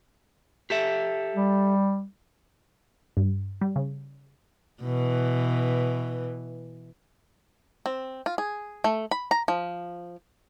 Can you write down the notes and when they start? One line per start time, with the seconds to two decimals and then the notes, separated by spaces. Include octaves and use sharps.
0.70 G4 A4 E5
1.35 G3
3.17 G2
3.61 G3
3.76 C#3
4.83 B2 E3
7.86 C4
8.26 F4
8.38 G#4
8.84 A3
9.11 B5
9.31 A#5
9.48 F3